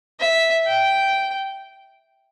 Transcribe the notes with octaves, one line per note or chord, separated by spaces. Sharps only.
E5
G5